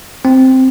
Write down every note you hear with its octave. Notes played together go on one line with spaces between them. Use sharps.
C4